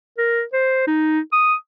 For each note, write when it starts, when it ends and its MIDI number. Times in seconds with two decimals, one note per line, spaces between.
0.18 0.42 70
0.53 0.85 72
0.87 1.19 63
1.32 1.54 87